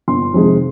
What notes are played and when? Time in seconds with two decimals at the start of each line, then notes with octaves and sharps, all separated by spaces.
0.08 G1 C6
0.34 F2 C3 D#3 G#3